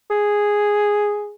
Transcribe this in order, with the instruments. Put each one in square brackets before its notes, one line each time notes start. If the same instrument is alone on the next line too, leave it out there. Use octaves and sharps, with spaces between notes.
[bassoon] G#4